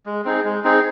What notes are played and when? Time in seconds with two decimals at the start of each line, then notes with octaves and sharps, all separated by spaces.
0.06 G#3
0.25 C4 D#4 G#4
0.44 G#3
0.64 C4 D#4 G#4